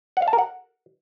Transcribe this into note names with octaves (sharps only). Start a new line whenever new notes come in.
F#5
F5
A5
A#4
F#5